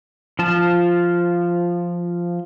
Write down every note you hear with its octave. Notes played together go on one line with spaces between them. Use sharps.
F3 F4 A5